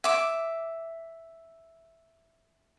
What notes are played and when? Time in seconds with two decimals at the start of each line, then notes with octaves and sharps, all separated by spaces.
0.04 E5 D6